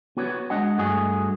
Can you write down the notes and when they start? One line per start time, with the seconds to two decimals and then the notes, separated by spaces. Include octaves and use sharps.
0.17 B3 F#4 B4 C#5
0.50 G#3 D4 D#5 F#5
0.78 G2 A3 F#4 G#4